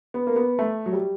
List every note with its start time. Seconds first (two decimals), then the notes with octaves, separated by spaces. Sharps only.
0.14 B3
0.27 A#3
0.36 B3
0.59 A3
0.86 F#3
0.92 G3